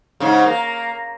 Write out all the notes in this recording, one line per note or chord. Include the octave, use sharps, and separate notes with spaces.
G#2 C#3
A#3